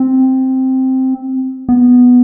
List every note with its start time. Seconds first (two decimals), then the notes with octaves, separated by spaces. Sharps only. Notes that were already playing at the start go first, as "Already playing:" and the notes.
Already playing: C4
1.69 B3